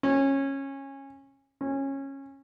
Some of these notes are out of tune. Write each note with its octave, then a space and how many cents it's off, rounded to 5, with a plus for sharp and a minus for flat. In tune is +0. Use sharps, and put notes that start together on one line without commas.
C#4 -20
C#4 -20